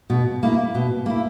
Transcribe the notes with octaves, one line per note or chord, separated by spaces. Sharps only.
B2
A#3 E4
B2
A#3 E4